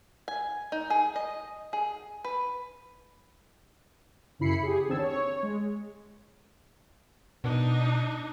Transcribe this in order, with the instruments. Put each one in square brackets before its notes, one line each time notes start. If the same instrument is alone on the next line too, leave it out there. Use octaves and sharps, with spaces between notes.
[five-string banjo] G#5
D#4
G#4
D#5
G#4
B4
[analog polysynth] F#2 C#3 E4 B5 C7 C#7
G4 G#4
D#2 D3 C4 A5 E6 G#6
C#5
G#3
[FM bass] B2 [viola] D4 D#4